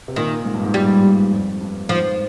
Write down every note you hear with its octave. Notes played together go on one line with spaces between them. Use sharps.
C3
A#2 D#3
G#2
G2
G#2
A#2 G3
A#2
F2
G2
G#2 F3